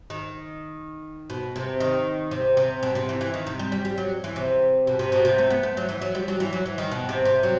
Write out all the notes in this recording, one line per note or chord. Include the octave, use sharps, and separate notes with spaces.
D#3
B2
C3
D#3
C3
C3
B2
C3
E3
E3
D#3
C3
G3
G3
G3
F#3
E3
C3
B2
C3
B2
C3
A3
B3
A3
F#3
E3
F#3
G3
F#3
E3
F#3
E3
D#3
B2
C3
C3
F#3